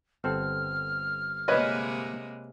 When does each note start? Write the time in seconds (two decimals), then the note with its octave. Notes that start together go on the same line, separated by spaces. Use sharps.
0.24 G1 C4 A4 F6
1.48 C3 G#3 A#3 B4 C#5 D#5